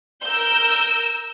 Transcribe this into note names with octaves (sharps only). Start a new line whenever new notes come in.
A#4 E6 G6